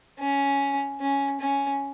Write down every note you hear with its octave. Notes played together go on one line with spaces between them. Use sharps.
C#4
C#4
C#4